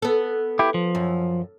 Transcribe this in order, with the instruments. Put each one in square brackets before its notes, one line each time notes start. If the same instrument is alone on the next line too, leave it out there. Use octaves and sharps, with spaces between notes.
[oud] B3 A4
[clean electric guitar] E4 G4
F3
[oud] F#2